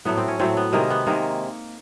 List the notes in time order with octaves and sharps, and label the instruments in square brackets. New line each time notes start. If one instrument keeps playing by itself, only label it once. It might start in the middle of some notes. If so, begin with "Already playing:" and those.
[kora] A2 F#3 A3 B3
C4
C#4
A2 F#3 A3 C4
B3
C3 D#3 G#3 A#3
B3
C3 D#3 G#3 A#3